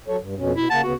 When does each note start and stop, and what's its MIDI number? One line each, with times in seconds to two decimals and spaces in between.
0.08 0.16 54
0.08 0.16 69
0.08 0.16 73
0.21 0.35 43
0.38 0.52 41
0.38 0.52 47
0.38 0.52 61
0.56 0.65 47
0.56 0.69 64
0.70 0.81 49
0.70 0.81 58
0.70 0.81 78
0.70 0.79 81
0.84 0.93 38
0.84 0.93 49
0.84 0.93 59
0.84 0.95 66